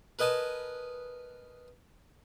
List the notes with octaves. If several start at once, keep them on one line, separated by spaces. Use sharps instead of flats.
A#4 B4 D#5 G#5 A5